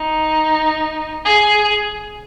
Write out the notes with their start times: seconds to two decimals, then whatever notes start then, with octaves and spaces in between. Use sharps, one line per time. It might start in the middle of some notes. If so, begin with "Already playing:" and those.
Already playing: D#4
1.25 G#4